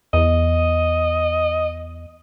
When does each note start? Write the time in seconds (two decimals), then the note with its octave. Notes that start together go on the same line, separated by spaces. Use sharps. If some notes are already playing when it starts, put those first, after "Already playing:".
0.13 E2 D#5